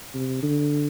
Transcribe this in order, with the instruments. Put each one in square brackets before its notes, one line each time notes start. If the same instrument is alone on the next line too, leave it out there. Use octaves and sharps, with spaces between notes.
[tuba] C3
D3